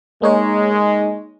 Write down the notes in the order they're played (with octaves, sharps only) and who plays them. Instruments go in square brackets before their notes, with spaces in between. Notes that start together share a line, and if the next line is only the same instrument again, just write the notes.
[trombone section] G#3 [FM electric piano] A#3 D#4 C#5